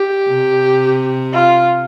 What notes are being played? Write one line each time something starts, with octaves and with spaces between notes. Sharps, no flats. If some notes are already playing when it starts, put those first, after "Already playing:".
Already playing: G4
C3
F4